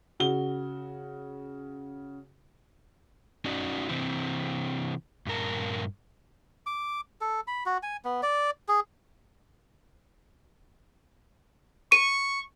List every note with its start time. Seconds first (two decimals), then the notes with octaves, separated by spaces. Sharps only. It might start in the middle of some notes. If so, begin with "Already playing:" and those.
0.20 C#3 F#4 G7
3.45 C#4 D#4 F#4 D5
3.89 C3 E3 C4
5.27 G2 A#2 A#4 A5
6.66 D6
7.21 A4
7.47 B5
7.66 F#4
7.83 G#5
8.05 B3
8.23 D5
8.68 G#4
11.92 C#6 D#7